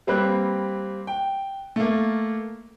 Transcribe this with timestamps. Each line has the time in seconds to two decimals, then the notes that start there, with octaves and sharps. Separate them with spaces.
0.07 G3 A#3 C4 B4 F#6
1.07 G5
1.76 A3 A#3